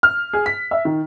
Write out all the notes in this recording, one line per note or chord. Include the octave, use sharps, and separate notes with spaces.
F6
G#4
B6
E5
D#3